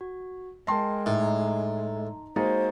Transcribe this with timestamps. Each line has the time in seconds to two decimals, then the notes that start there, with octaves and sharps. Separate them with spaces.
0.01 F#4
0.67 G#3 A#4 G5 A5 C6 A#6
1.06 A2 D#4 A#5
2.36 G#3 A#3 D#4 F#4 C5 A6